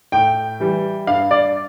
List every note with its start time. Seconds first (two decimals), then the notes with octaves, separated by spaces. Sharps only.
0.12 A2 G5
0.60 E3 G3
1.07 G2 F5
1.31 D5